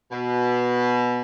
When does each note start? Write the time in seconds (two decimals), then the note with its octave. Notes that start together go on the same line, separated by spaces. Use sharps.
0.11 B2